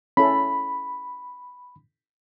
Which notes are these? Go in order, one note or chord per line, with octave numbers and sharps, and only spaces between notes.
C#4 E4 A4 B5